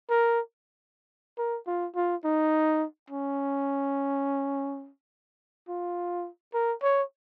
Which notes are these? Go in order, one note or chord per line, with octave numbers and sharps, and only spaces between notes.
A#4
A#4
F4
F4
D#4
C#4
F4
A#4
C#5